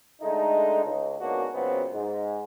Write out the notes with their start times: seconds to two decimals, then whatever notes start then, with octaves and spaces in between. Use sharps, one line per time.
0.22 D3 G#3 A3 D#4
0.84 C#2
1.21 G#2 B2 A#3 C#4 D4 F#4
1.54 C#2 F#2 A#2 F#3 B3 C4
1.93 G#2